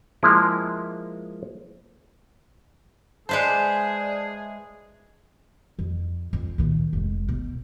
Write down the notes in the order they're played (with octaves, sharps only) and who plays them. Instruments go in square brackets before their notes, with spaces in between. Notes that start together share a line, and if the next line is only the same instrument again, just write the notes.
[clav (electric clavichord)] F3 G#3 A#3 E4 F4
[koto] G#3 B4 C5 [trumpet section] G#4 [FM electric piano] D5 E5 A5
[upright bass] F2
F2
A#2 D#3
F1 G#3
B2